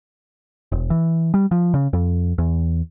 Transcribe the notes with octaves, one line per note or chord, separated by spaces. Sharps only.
E1
E3
G3
F3
C#3
F2
E2